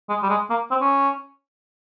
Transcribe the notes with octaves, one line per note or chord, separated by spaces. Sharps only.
G#3
G3
G#3
A#3
C4
C#4